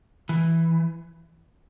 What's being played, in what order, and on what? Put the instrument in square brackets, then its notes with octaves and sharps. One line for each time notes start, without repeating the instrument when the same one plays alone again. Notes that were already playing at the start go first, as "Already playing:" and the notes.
[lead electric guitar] E3